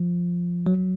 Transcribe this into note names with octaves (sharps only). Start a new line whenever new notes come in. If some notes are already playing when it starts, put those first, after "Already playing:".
Already playing: F3
F#3